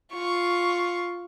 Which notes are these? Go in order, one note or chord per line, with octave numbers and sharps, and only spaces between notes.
F4 C#6